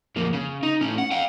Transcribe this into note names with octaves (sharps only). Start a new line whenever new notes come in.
F2 A#3
C#3
D#4
A2 C#4
F#5
F5 G5